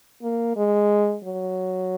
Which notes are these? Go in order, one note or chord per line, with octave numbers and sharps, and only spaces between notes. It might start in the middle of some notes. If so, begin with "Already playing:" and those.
A#3
G#3
F#3